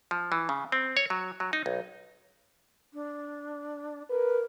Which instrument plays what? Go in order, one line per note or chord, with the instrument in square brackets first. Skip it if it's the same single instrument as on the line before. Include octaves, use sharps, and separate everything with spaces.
[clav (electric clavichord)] F3
E3
C#3
C4
C#5
F#3
F#3
D#4
B1
[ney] D4
[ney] A#4 [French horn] B4